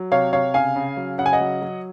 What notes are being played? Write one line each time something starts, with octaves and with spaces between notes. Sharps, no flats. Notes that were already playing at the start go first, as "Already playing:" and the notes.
Already playing: F#3
C3 C#5 F5
C3 C#5 F5
C#3 F5 G#5
C#3
F#3
C#3 F#5
G#5
D#5 F#5
F#3
F#3